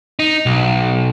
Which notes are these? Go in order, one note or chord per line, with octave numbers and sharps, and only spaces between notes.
D#4
B1